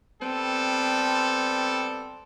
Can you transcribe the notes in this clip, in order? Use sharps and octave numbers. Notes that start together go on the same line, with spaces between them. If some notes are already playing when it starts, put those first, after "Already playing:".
G3 B3 C4 A4